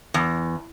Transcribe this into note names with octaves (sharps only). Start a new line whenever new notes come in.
E2